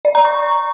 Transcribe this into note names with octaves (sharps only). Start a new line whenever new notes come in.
D5
A#5
C#6